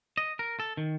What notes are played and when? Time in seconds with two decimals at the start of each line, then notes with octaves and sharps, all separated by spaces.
0.17 D#5
0.39 A#4
0.60 A4
0.77 D#3